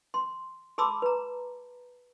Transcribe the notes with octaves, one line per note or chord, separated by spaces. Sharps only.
C6
G#4 A5 B5 C6 D6 E6
B4 A#5